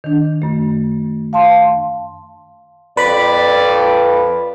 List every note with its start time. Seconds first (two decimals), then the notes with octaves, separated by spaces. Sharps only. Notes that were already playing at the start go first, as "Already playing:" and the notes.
0.04 D#3 D4
0.42 F#2 A3
1.33 F5 A5 C6
2.97 F2 B4 D5 B5